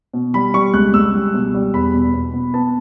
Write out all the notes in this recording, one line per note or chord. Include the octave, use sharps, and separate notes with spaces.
B2
G3 B5
G3 C#6
C#2 F#6
C#2 E6
G3
B2
G3
E2 B5
B2
B2
B2
B3 A5